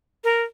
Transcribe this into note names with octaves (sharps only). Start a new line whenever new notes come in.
A#4